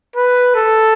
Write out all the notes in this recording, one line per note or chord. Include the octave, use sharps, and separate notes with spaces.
B4
A4